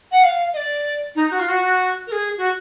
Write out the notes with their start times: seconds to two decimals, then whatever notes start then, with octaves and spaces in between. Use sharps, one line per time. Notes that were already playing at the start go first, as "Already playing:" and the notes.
0.12 F#5
0.23 F5
0.53 D#5
0.57 D5
1.16 D#4
1.31 F#4
1.39 F4
1.49 F#4
2.07 A#4
2.12 G#4
2.38 F#4